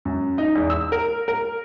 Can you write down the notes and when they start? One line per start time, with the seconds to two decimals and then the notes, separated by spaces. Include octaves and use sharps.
0.05 F#2
0.38 D#4
0.55 E2
0.70 E6
0.92 A#4
1.28 A#4